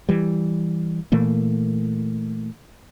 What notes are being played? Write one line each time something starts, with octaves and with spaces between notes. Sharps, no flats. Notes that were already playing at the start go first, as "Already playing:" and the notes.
E3 G3
A#2 E3 A3 A#3